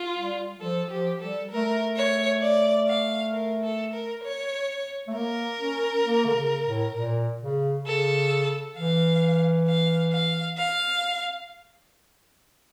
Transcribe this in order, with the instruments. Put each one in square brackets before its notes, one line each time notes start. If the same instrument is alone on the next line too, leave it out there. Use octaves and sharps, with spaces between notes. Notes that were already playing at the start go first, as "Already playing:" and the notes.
Already playing: [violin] F4
[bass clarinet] G3
[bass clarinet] F3 [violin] A4
[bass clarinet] F3 [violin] G4
[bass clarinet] G3 [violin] A4
[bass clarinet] A3 [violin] A#4
[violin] C#5
D5
F5
A#4
A4
A#4
C#5
[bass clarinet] A3
[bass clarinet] A#3 [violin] A#4
[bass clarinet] C#4
A#3
D3
C#3
A2
A#2
C#3
[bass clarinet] C#3 [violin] A4
[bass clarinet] E3 [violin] F5
[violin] F5
F5
F5